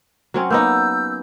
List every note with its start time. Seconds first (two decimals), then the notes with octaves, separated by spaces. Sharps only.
0.34 F#3 C4 C#4
0.50 A#3 B3 D#4 E6 G6